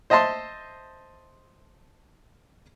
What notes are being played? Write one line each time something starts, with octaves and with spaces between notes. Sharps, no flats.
C5 D#5 E5 A5 C6